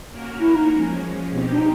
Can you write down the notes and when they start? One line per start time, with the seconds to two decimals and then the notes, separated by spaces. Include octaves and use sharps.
0.11 A#3 C#4 F#4 A#4
0.40 E4
0.55 D#4
0.70 F3 G#3 C#4
1.30 B2 G#3 C4 D#4 G4
1.52 D4
1.58 D#4